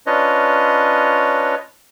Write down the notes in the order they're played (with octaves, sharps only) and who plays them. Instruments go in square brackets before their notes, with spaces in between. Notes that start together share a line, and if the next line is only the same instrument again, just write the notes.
[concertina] C#4 D4 F4 B4 C#5 D#5